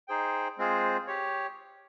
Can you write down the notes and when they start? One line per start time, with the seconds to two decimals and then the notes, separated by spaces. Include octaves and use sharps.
0.08 D#4 G#4 C5 G5
0.58 G#3 C4 F4 G#4 C5
1.07 G4 C#5